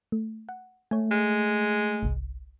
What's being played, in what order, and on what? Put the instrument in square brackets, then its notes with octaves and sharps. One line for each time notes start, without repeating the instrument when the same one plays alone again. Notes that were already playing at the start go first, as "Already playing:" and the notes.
[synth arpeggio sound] A3
F#5
[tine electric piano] A3 [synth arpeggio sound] C#5 G#5
[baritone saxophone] G#3
[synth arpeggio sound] G1 C2